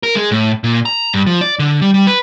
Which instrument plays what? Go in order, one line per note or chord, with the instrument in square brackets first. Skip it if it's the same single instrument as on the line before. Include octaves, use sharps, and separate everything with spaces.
[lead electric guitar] A#4
G#3
A2
A#2
A#5
G2
F3
D5
D3
G3
G3
B4